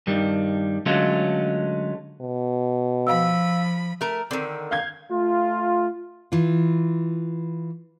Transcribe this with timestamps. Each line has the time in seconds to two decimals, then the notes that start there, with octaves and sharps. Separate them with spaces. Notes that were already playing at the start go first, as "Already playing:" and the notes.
0.07 G2 D#3 G3
0.86 D3 F#3 G#3 A3 C#4 F4
2.21 B2
3.07 F3 F5 B5 E6
4.01 A3 A#4
4.31 D3 D#3 C4
4.71 F5 G6 G#6
5.11 A3 F4
6.32 E3 F4